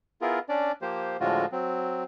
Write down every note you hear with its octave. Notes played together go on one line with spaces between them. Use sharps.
B3 E4 F4 G#4 A#4
C#4 D4 D5
F3 A#3 G4 C5
A2 D3 F3 G#3 F4 F#4
F#3 C4